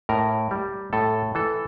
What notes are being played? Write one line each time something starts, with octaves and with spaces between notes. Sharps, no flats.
A2 A#4
G3
A2 A4
E3 A4